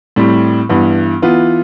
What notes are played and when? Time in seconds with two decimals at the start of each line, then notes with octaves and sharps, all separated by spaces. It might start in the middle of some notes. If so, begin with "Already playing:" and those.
0.16 A2 G3 C4
0.69 G2 E3 B3
1.22 E3 B3 F4